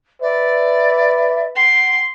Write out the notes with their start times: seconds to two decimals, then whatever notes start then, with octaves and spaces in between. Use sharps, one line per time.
0.22 B4 D5 E5
1.55 F#5 G5 C6